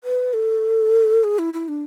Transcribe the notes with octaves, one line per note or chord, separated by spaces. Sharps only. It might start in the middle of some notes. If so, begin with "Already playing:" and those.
B4
A4
G#4
E4
E4
D4